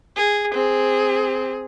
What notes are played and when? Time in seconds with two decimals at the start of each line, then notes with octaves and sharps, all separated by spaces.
0.17 G#4
0.54 C4 G#4